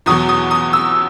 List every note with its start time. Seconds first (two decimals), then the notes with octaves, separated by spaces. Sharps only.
0.06 E2 B2 F#3 D#6
0.29 D#6
0.51 D#6
0.73 E6